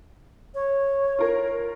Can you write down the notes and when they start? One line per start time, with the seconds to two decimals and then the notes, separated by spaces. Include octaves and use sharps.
0.55 C#5
1.19 F4 A#4